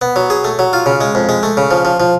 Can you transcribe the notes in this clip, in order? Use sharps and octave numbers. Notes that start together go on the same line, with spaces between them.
B3
F#3
G#4
A3
F#3
F4
C#3
G#3
F2
G#3
A3
C#3
F3
F3
F3